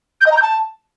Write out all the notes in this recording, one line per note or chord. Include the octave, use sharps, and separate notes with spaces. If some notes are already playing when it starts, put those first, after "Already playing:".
G6
D#5
A#5
G6
A5